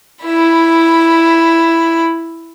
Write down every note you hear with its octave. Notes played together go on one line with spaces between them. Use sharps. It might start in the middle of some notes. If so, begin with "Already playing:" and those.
E4 B5